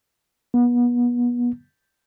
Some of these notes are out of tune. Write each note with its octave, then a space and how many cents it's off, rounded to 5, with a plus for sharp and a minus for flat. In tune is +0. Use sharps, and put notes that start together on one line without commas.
B3 -30